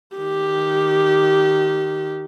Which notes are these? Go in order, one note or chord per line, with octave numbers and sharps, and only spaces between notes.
D#3 G4